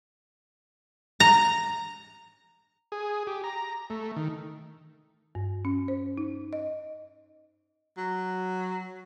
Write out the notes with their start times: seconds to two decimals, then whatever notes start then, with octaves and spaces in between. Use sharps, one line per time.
1.20 A#5
2.92 G#4
3.27 G4
3.44 A#5
3.90 A3
4.16 D#3
5.35 G2
5.65 C#4
5.88 C5
6.18 D#4
6.53 D#5
7.97 F#3